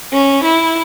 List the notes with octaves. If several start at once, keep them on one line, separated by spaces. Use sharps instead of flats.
C#4
E4